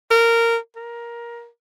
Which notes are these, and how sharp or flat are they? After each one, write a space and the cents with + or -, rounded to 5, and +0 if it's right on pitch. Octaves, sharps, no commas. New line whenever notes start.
A#4 -15
A#4 +15